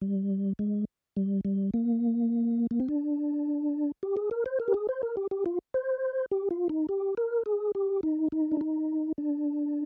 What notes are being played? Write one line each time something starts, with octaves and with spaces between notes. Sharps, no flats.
G3
G#3
G3
G3
A#3
A#3
C4
D4
G4
G#4
A#4
C5
A#4
G4
G#4
C5
A#4
G4
G4
F4
C5
G4
F4
D#4
G4
A#4
G#4
G4
D#4
D#4
D4
D#4
D4